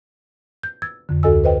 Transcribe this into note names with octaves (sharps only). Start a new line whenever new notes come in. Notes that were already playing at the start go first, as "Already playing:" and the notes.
G6
E6 G#6 A6
F2 D3
D2 F#4 A4 D#5 G#5 E6
B4 C5 D#5 G5